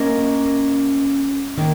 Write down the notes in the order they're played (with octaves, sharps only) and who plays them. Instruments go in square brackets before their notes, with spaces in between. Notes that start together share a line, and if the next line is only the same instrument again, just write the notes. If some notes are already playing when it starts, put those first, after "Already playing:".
Already playing: [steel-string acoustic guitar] A#3 C#4 A#4 D#5
D#3 A#3